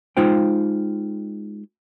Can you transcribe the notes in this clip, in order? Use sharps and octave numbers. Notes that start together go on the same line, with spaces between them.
G#3 D#4 F4 C5 G5